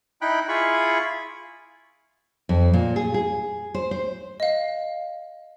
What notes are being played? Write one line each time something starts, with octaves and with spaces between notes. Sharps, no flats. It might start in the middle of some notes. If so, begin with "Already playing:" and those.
D#4 E4 G5 B5 F#6
E4 F4 G#4 B5 C#6
F2
A#2
G#4
G#4
C5
C5
D#5 F5